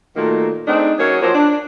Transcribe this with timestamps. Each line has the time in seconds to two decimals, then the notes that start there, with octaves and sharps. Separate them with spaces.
0.16 A#2 D#3 F#3 A3 A#3
0.67 A3 C4 D4 D#4 G#4
0.99 F#3 C#4 G#4 A#4 C#5
1.22 F3 F#3 A#3 F#4 C5
1.35 D4